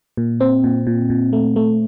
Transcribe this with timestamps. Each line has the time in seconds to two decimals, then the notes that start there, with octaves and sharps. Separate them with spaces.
0.17 A#2
0.40 C4
0.64 A#2
0.87 A#2
1.10 A#2
1.33 A3
1.56 A3